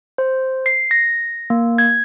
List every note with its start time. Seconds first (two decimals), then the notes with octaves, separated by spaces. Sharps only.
0.18 C5
0.66 C7
0.91 A#6
1.50 A#3
1.78 G#6